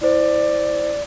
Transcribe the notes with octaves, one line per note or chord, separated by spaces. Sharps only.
E4 C5 D5